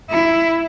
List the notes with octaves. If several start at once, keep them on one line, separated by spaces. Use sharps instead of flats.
E4